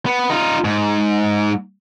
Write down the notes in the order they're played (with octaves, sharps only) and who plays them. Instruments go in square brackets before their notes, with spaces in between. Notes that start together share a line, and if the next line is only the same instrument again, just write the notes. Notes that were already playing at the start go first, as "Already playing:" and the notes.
[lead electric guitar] B3
D#4 F4
G#2